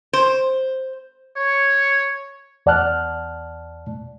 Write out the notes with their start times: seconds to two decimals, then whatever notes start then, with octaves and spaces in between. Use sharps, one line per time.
0.13 C5
1.37 C#5
2.66 E2 D5 F#5 A5 F6 F#6